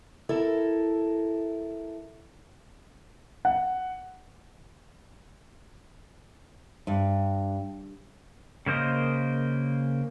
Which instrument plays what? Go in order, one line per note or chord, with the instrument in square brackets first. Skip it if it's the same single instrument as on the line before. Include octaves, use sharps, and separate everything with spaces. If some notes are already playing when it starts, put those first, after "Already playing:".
[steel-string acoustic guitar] E4 A4 A#4
[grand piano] F#5
[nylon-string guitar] G2
[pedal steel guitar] C#3 A#3 C5 D#5